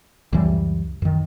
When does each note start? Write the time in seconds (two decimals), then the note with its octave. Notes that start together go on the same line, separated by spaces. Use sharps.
0.33 C#2 F#2 E3 G3
1.02 F#2 D#3